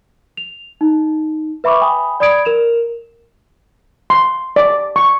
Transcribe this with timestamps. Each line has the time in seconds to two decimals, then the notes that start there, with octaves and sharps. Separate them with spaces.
0.37 F7
0.81 D#4
1.64 B4 E5 B5 C#6 D6
1.81 G5 G#5 B5 D#6
2.20 D5 B5 D#6 G#6 D7
2.45 A#4 E7 F7
4.10 C6
4.56 D5
4.96 C#6